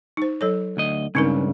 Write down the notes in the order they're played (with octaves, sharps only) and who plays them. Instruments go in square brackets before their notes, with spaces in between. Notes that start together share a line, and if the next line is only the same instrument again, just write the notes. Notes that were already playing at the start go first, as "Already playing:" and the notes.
[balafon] D#4 C5
F#3 A4 C#5
[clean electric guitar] D2 D#5
[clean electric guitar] C#2 G2 C#3 [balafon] C4 D#4 A#4